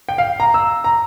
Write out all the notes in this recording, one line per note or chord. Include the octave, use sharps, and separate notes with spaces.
G5
F5
A#5
E6
A#5